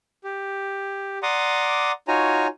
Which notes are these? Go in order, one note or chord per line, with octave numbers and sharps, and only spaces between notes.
G4
D5 F#5 A#5 C6 D6 D#6
D#4 F4 F#4 C#5 G#5 A#5